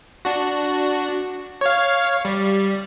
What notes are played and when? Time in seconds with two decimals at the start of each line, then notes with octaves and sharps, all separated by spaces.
0.25 D4 F#4
1.61 C#5 F5
2.25 G3